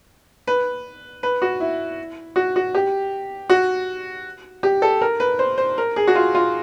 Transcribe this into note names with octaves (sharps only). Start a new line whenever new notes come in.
B4
B4
F#4
E4
F#4
F#4
G4
F#4
G4
A4
A#4
B4
C5
C5
A#4
G#4
F#4
F4
F4